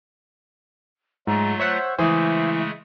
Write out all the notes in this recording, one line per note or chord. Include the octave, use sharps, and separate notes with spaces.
G#2 F#3 A3 F4 A#5
C5 C#5 E5 F#5
C#3 E3 G#3 A3 C5 E5 D#6